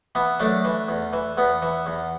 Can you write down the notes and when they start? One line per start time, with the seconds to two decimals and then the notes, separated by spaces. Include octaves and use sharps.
0.15 E3 B3
0.40 F#2 A3 D4
0.65 E3
0.89 E2
1.13 E3
1.37 E2 B3
1.62 E3
1.86 E2